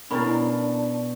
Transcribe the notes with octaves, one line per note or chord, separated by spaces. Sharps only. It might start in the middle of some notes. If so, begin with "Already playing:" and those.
B2 C#4 D4 E4 A#4 D5 B5